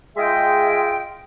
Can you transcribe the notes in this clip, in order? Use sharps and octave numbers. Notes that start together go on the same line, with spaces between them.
G#3 F4 G#4 D#5 E5 G5